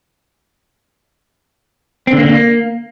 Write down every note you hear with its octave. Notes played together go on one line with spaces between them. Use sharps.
C4
D3
A#3
D3
A#3